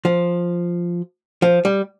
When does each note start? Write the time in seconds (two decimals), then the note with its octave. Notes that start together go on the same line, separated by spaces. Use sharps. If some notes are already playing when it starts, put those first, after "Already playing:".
0.05 F3
1.42 F3
1.65 G3